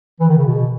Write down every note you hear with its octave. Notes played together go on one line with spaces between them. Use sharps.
E3
D#3
C#3
B2